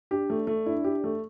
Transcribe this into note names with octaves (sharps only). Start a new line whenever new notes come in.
D4 G4
A3
A3
D4 E4
G4
A3